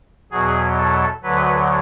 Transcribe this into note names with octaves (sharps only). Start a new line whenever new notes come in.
E2 B2 F#3 G#4
A4
D2 D3 F#3 B4